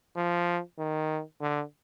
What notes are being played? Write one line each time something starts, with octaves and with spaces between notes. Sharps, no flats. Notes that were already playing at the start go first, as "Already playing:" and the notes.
F3
D#3
D3